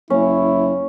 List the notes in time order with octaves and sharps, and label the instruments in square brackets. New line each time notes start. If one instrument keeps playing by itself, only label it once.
[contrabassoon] F#1 [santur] C#4 [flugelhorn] E4